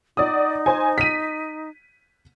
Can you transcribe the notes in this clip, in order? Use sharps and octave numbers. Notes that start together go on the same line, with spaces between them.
D#4 D5 F#5 D#6
C5 G#5
B6 D#7